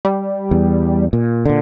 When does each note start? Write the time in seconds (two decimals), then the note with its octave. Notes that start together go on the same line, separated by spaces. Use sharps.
0.05 G3
0.51 E2
1.13 A#2
1.45 A#2 D3